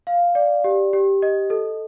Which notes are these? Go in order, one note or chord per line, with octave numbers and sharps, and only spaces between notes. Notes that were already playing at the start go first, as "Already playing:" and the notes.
F5
D5
G4
G4
D#5
A4